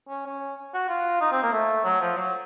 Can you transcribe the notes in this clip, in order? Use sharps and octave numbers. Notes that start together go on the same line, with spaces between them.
C#4
C#4
F#4
F4
D#4
C4
A#3
A3
F#3
F3
F#3